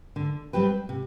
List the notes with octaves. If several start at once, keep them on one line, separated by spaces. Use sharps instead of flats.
D3
G3 C4 G4 B4
C3